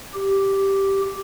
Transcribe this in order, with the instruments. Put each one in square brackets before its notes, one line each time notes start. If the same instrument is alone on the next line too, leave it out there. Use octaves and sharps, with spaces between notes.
[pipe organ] G4